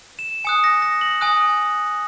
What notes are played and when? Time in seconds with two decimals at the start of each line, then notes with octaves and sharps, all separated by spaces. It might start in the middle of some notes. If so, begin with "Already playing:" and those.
0.19 E7
0.45 G#5 D#6 F#6 C#7
0.64 A#6
0.82 A#6
1.01 F#7
1.21 G#5 D#6 F#6